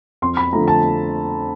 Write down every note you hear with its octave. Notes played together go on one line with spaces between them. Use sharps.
F2 C6
B5
D3 F3 A3 A#5
A5